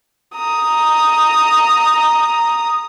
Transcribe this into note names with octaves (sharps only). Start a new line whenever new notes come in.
A#5 D#6